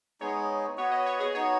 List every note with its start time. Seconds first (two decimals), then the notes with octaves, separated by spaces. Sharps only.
0.20 G#3 B3 D#4 G#4 C#5
0.78 B3 F#4 B4 C#5
0.91 D#5
1.06 C#5
1.20 G#4
1.34 B3 D#4 F#4 C#5